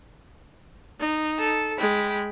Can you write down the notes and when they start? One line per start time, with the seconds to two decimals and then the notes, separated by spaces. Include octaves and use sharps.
1.00 D#4
1.39 A4
1.78 G#3 G5 B5